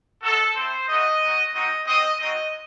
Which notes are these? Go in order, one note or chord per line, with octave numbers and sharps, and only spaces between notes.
G#3 D#4 F#4 A4
C4 E4 C5
A3 D#4 F#4 D#5
G#3 D#4 F#4
G#3 C4 D#4 F#4 D#5
C4 F#4 D#5
G#3 C4 D#4 F#4 D#5